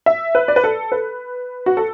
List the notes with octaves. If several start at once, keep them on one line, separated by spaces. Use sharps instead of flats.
E5
B4
D5
B4
A4
B4
F#4
A4